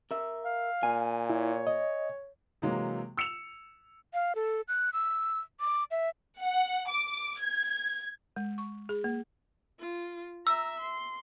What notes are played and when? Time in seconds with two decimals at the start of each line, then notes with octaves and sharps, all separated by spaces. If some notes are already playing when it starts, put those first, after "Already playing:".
0.11 A#4 E5
0.45 F5
0.83 A#2 G#5
1.30 E4 C#5
1.67 D#5
2.62 C3 E3 F#3 G#3 A#3
3.17 E6 C#7 E7 F7
4.14 F5
4.35 A4
4.68 F#6
4.93 E6
5.60 D6
5.91 E5
6.42 F#5
6.88 D6
7.41 G#6
8.36 G#3
8.58 C#6
8.89 G#4
9.04 A#3
9.79 F4
10.47 E5 A#5 E6
10.80 C6